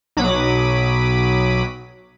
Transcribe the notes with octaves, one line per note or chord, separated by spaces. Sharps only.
B1 F#3 B5 D6 D#6